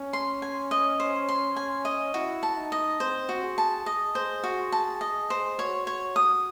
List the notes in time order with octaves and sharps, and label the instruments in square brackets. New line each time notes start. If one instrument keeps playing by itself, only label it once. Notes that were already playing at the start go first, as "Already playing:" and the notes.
Already playing: [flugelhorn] C#4
[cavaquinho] C6
G#5
D#5
C5
C6
G#5
D#5
[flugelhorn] E4 [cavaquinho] F#4
[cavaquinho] A5
[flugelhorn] D#4
[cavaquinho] D#5
[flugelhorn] C4 [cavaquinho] C5
[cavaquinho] F#4
[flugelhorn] G#4
[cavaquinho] A5
[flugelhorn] G#4 [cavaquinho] D#5
[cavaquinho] C5
F#4
A5
D#5
C5
[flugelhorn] F#4 [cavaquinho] C#5
[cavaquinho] C#5
D#6